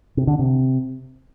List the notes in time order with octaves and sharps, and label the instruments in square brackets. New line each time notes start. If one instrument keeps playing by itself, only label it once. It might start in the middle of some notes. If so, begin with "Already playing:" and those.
[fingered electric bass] C3
D3
C3